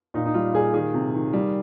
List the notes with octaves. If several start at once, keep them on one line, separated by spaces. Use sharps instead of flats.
A#2 D#4
D#4
G3 F4
A#2 G#4
D#3 G#4
C3
D#3
G3